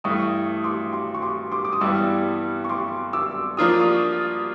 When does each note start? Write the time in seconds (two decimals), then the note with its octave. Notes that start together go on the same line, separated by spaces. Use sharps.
0.04 G2 E3 A3 C#6 D#6
0.64 C6 D6
0.93 C6 D6
1.14 C#6
1.22 C6 D6
1.52 C6 D6
1.65 D6
1.73 D#6
1.81 G2 E3 G3 B3 D6 E6
2.64 C#6
2.69 C6 D6
3.13 D6 E6
3.57 F3 A#3 D4 F4 D#6
3.69 D6
3.80 C#6 D#6